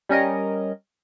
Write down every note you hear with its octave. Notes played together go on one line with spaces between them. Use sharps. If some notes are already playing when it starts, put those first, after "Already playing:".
G3 C#4 A#4 D#5